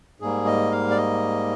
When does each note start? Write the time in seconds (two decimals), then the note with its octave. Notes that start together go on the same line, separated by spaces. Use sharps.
0.20 G#2 G3 A#3 G#4
0.46 D#5
0.71 F5
0.90 D5
0.97 D#5